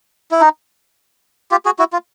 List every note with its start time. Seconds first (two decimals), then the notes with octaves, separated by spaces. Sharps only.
0.31 E4
0.41 D#4
1.51 F4 G4
1.65 F#4 G#4
1.79 E4 F#4
1.93 F4